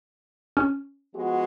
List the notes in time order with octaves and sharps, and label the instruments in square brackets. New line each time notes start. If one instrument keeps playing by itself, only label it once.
[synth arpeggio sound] C#4
[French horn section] F3 G#3 B3 F#4